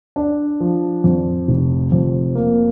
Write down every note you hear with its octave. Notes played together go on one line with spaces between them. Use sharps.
D4
F3
F2
F1
F2
A#3